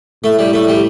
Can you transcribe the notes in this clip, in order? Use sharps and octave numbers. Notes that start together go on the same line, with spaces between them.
A2 A3
G3
A3
G3